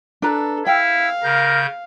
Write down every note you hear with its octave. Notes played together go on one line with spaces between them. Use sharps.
D4 A4 B4 A#5
E4 F5 G5 E6
C#3 A#4 G6